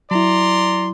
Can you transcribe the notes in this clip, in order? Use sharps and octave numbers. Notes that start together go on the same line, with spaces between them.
F#3 E4 D5 A#5 C6